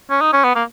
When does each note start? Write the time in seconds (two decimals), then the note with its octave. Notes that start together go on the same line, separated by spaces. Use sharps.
0.10 C#4
0.21 D#4
0.33 C#4
0.44 B3
0.55 A#3